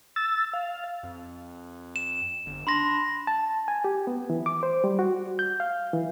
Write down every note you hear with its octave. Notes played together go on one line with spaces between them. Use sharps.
E6 A6
F5
F2
E7
G1
D4 B5 C6 A#6
A5
G#5
G4
B3
E3
D6
C5
G3
F#4
G6
F5
E3